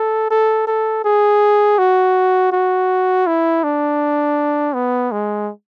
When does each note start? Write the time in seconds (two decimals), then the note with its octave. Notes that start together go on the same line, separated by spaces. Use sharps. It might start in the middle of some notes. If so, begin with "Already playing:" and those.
Already playing: A4
0.30 A4
0.67 A4
1.04 G#4
1.78 F#4
2.52 F#4
3.27 E4
3.63 D4
4.74 B3
5.12 G#3